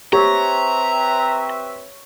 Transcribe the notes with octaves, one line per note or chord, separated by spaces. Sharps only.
C4 G4 B4 C#5 E5 A#5